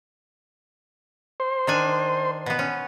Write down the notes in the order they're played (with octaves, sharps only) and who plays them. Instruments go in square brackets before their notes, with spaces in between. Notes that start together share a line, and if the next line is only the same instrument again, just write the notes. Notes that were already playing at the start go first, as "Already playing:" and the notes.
[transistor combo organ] C5
[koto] D#3 D4 G#5
B2 B3
C#4